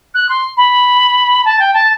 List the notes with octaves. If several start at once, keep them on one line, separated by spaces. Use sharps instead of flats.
F#6
C6
B5
A5
G5
A5